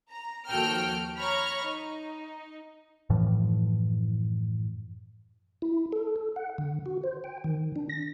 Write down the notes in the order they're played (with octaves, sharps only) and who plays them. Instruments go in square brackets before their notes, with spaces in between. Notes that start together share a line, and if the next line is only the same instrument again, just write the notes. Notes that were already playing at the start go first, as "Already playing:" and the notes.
[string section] A#5
D#2 F3 F#4 A4 G5 F6
C#5 A#5 B5 C#6 F6
D#4
[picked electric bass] F#2 A2 E3 F3
[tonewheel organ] E4
A4
A4
F#5
D3
F#4
C5
G5
D#3
D4
A#6